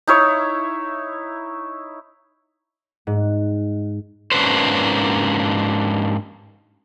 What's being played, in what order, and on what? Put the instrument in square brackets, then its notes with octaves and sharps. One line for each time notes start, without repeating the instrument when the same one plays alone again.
[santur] D#4 E4 C#5
[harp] G#2
[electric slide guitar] G#2 A#3 C#4 D4 B4 C5